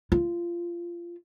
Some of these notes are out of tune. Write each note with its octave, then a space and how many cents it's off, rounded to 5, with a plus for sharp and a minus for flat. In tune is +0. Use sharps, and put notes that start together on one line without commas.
F4 -20